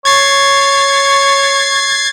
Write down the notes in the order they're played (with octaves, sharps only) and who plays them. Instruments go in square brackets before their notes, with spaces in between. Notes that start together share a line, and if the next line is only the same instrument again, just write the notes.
[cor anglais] C#5 [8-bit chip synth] G#6 A6 C7